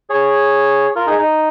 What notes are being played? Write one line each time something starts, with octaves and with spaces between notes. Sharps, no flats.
G#4 C#5
F4 A#4
D#4 G#4
D#4